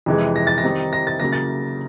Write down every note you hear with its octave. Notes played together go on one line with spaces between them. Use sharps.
F2 C3 E3 G#3
A#6
A6
A#6
D#3 G3 C4 D#4
A#6
A6
C#3 F#3 A#3 A#6
A6